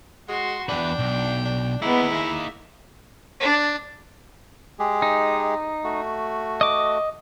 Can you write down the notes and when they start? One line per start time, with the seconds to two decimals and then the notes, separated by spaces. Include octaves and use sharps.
0.29 G#3 F#4 C6
0.69 E2 D4 B4 G5
0.99 B1
1.45 D4
1.82 G#3 A#3 B3 D#4 E4
2.13 E5
3.40 D4
4.79 G#3 G4 G#4
5.02 D#4
5.84 A3 F#4
6.61 D#5 D6